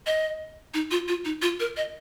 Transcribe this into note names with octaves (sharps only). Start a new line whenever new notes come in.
D#5
D#4
F4
F4
D#4
F4
A#4
D#5